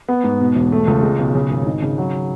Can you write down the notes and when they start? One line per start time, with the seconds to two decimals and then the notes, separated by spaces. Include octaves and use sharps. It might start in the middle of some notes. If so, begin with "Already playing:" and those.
0.09 B3
0.24 G#2
0.41 B2
0.55 E1
0.72 A3
0.87 C#2
1.03 G#3
1.19 B1
1.35 C#3
1.51 G#1
1.66 D#4
1.82 C#3
1.98 F#3